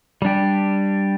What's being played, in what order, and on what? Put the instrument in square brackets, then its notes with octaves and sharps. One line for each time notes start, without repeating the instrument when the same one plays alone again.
[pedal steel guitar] G3 D4 G4